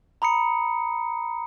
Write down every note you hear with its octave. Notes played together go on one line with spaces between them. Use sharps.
A#5 B5 D#6 C#7